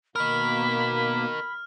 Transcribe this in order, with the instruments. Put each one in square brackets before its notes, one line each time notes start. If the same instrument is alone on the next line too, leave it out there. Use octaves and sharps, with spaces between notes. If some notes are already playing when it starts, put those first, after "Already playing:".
[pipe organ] B2 A#3 [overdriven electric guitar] A#4 D#5 [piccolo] B5 [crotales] F6